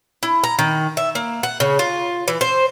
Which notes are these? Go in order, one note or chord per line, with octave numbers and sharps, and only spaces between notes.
E4
A#5
D#3
E5
A#3
F#5
C#3
F4
E3
C5